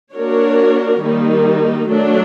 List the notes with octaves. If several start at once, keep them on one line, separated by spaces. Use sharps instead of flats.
A#3 D4 F#4 A#4 C#5
D#3 G3 A#3 D#4
F#3 A3 D4